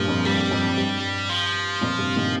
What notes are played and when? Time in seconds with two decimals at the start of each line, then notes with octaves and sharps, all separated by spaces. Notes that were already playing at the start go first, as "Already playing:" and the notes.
Already playing: G2 A#2 F3
0.08 F2
0.25 G2 G3
0.51 F2
0.77 G2
1.29 F3
1.81 F2 A#2
1.98 G2 C3
2.16 A#2 D#3